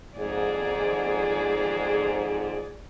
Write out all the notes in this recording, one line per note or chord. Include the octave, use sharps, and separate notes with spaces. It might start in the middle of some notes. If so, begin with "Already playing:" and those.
F2 G#2 G#4 D5